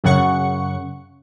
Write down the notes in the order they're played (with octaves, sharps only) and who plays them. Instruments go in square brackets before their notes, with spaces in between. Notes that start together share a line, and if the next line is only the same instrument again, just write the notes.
[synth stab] F#2 C#3 F#5 C#6 C#7